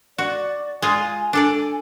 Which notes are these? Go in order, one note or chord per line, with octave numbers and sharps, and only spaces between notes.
F#4 D5
G#3 F4 G#5
D4 A4 D5 G#5